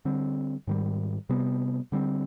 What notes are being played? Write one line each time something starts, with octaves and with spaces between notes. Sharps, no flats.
D3 G3 C4
G#2 D#3 G3
C3 G3 B3
D3 G3 C4